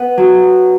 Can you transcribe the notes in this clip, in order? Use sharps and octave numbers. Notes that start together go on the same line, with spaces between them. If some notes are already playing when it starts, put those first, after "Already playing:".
Already playing: B3
F#3